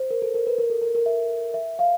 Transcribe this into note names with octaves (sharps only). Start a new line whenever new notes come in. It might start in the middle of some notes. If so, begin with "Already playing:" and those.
Already playing: C5
A#4
A4
A#4
B4
A#4
A4
A#4
A#4
E5
E5
F5